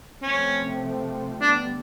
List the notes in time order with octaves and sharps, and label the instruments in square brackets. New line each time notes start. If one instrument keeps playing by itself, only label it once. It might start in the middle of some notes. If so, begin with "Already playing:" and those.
[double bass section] C3 F3 A3 C4 [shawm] C#4
[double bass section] D3 G3 B3 [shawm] D4